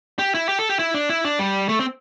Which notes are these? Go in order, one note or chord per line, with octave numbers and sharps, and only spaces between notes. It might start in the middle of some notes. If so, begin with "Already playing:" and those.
G4
E4
G4
A4
G4
E4
D4
E4
D4
G3
A3
C4